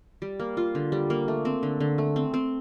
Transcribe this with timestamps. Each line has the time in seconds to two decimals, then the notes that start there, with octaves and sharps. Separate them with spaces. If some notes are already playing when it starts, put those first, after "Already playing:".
0.22 G3
0.40 A#3
0.57 F4
0.75 D3
0.92 G3
1.10 A#3
1.28 A3
1.45 C4
1.63 D3
1.80 D3
1.98 A3
2.16 C4
2.34 C4